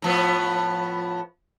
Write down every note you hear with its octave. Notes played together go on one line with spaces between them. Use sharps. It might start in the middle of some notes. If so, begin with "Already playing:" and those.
A2 F3 B3